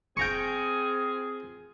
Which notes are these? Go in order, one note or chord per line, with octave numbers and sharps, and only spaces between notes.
C4 F4 G#4 G5 A#5 C#6